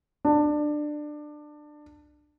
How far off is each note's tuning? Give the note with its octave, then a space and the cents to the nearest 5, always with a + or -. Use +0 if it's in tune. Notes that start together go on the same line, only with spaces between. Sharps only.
D4 +20